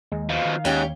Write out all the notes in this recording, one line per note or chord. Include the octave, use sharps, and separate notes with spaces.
D#2 G#3
B2 F3 F5
D#3
D#2 G#2 C#4 G4